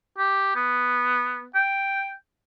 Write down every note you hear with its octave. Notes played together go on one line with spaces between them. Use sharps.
G4
B3
G5